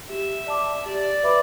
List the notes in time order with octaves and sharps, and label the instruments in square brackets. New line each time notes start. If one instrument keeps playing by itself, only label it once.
[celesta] G4 [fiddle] E5
[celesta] D5 A5 D6
[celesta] G4 [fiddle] D5
[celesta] B4 E5 B5 D6